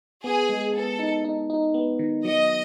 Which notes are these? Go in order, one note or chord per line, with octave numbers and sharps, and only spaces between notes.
B3 G#4
G#3
B3 A4
D#4
D#4
D#4
B3
D#3
F#3 D#5